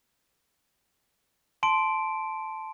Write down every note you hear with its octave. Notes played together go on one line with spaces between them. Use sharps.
A5 C6 D7